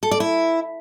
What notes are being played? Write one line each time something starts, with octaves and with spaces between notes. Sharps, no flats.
A4
D5
E4